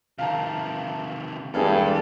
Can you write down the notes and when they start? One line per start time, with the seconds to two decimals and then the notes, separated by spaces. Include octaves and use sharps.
0.18 C3 D#3 F5 A5 A#5
1.54 E1 G2 E3 G#4 A4